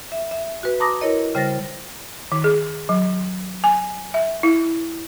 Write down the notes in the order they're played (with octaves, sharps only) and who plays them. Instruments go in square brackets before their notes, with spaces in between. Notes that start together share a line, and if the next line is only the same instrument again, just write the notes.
[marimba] E5
E5
F#4 B4
A5 A#5 C6 D6 D#6 A#6
E4 A#4 C#5 D#5
C#3 G3 C5 F6 A6 A#6
[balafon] D#3
G#4
F#3
G#5
E5
E4